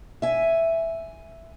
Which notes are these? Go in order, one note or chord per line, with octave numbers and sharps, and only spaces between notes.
E5 G#5